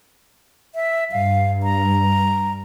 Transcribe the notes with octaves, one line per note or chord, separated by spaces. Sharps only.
E5
G2 F5
A#5